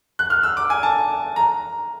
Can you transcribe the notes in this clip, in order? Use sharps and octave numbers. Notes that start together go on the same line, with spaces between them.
F#6
F6
E6
D6
G#5
A5
A#5